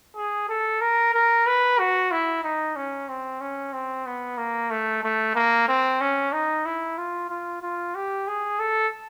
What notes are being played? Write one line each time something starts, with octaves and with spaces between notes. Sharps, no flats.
G#4
A4
A#4
A#4
B4
F#4
E4
D#4
C#4
C4
C#4
C4
B3
A#3
A3
A3
A#3
C4
C#4
D#4
E4
F4
F4
F4
G4
G#4
A4